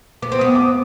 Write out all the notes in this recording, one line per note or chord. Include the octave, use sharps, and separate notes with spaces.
B3 D6
C4
B3 D#6
D#6
D6